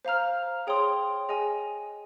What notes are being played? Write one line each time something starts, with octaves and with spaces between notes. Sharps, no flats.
C5 F5 A#5 F6
G#4 C#5 G5 C6 D#6
G#4 D#5 G#5